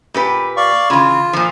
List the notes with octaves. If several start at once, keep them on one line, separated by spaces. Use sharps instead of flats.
A#2 G4 B4
D5 F5 C#6
C#3 E3 F4
A#2 F3